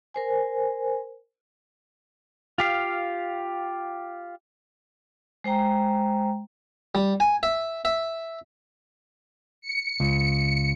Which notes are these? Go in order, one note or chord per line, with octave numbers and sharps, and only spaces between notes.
A#4 C5 G#5
F4 G4 F5
G#3 C5 G5 A#5
G3
G#5
E5
E5
C#7
C#2